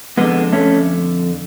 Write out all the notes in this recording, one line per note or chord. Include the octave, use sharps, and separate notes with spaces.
F2 D3 G#3 B3
A3 C#4